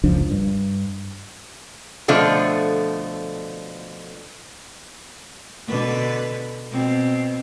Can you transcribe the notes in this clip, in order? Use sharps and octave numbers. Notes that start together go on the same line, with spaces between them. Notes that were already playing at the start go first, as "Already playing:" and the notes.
F#1 C#2 F3 D4
G2
B2 D3 F3 A3
B2 D3 B4
B2 C4